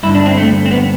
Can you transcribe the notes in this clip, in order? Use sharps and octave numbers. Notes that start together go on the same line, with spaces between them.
G2 D3 E4
D4
C4
A3
C4
B3